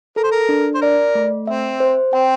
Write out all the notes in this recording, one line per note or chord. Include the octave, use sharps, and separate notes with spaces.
A4 A#4
C5
A#4
D4
C5
A#4 D5
A3
C4 E5
C5
C4 G5